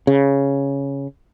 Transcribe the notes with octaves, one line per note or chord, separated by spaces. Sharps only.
C#3